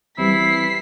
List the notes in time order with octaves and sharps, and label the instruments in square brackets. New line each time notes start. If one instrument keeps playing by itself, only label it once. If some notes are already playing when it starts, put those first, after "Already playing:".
[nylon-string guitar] E3 G3 C4 [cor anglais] E4 [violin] B6 C7